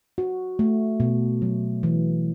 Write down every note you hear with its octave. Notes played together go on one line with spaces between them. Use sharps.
F#4
A3
B2
F#3
E3